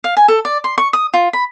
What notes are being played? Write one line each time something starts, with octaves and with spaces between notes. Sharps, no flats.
F5
G#5
A4
D5
C6
C#6
D#6
F4
B5